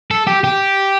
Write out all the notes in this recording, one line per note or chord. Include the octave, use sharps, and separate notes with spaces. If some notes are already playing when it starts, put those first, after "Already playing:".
A4
G4
G4